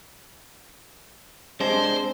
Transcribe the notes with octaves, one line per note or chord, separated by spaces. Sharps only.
C3 G#3 D4 C5